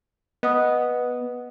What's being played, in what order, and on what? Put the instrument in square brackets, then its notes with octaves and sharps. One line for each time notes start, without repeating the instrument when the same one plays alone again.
[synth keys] B3 [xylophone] D#5 F#5 D#6